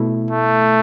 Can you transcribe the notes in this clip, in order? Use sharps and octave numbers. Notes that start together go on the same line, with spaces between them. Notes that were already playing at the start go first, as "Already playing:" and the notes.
Already playing: B2 A3 E4
A3